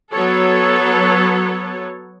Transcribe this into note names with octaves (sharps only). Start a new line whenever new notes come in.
F#3 B3 A4 C#5